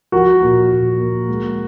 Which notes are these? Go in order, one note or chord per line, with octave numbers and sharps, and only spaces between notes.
F3 F#4 A#4
A#2
A#2
A#3
G#3